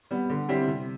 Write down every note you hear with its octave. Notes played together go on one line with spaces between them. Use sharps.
G3 B3
D3
G3 C4 E4 G4
C3